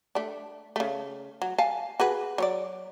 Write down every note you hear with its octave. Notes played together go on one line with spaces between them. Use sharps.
A3 D4
C#3 A3
F#3
F5 G#5 A5
F#4 G#4 B4
F#3 C#5 D5